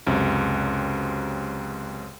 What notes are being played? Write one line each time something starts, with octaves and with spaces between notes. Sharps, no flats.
C#2 F#2 C3